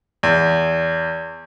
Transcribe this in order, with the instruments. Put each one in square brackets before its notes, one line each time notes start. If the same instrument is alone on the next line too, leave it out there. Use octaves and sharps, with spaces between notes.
[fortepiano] E2